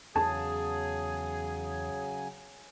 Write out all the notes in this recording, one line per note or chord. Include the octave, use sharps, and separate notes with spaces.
E2 C#3 F#3 G#4 G#5 A5